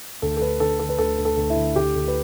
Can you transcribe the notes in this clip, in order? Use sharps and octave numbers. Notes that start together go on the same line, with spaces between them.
D2 A4
A4
D3 B4
D3 A4
D3 A4
B4
D2 A4
D2
A4
D2
E4
D3
D2 G4
D2
B4